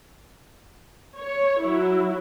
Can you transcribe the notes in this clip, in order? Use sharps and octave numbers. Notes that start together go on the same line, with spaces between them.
C#5
F#3 E4